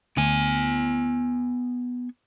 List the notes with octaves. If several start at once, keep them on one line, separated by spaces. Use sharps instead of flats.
D2 B3 G#5